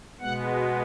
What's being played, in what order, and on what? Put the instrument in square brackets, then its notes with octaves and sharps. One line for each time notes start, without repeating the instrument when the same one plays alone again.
[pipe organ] B2 G#3 B3 F#5